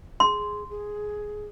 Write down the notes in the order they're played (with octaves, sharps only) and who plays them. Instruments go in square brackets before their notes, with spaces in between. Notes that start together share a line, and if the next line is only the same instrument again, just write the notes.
[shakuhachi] G#4 [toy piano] C6
[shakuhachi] G#4